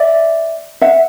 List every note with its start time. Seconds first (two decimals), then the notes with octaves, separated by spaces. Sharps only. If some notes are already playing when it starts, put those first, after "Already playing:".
Already playing: D5 E5
0.81 E5 F#5